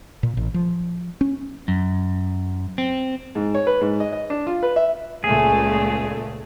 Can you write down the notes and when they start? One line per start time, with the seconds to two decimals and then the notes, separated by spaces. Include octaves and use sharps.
0.23 A#2
0.37 A1
0.54 F3
1.21 C#4
1.68 F#2
2.78 C4
3.35 G#2
3.55 C#5
3.67 B4
3.81 G#2
4.00 D#5
4.13 D#5
4.30 D4
4.47 F4
4.63 B4
4.76 E5
5.24 C#2 A#2 A3 G#4